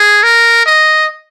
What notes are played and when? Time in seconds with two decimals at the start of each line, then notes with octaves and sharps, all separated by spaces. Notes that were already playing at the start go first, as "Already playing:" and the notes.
Already playing: G#4
0.23 A#4
0.66 D#5